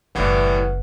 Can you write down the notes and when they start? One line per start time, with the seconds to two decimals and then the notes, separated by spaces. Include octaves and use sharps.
0.15 F#1 A2 E3 G3 B4 F#5